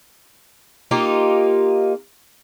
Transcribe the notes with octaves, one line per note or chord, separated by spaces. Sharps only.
A#3 D#4 F4 G4